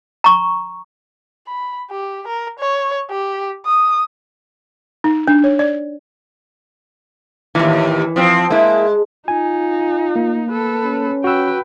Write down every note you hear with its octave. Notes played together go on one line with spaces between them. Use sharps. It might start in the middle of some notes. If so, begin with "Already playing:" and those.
A#5 C#6
B5
G4
A#4
C#5
G4
D#6
D#4
D4
C#5
D5
D#2 A2 E3
F3 C4
G#3 A#3 E4
D#4 F4 G#5
A#3
A4 B4
C#4
F#4 B4 G5 E6